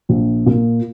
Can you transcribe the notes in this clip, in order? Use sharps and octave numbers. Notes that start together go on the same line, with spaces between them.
A#1
A#2